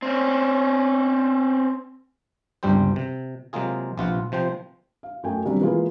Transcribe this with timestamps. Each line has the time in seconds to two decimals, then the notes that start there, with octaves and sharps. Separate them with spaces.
0.02 C4 C#4
2.63 G1 C#2 G2 G3 C4 C5
2.96 C3
3.53 C3 F#3 G#3 A#3 F4 G#4
3.98 A#1 C3 F4 B4 F#5
4.32 C3 F3 C5 G5
5.03 F5
5.23 F#2 A3 G5 G#5
5.45 D3 F#3 G3 C4 D4
5.61 E3 G#3 A#3 F4 G#4 B4